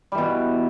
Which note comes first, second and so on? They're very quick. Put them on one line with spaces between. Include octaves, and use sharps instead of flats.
G3 E3 B2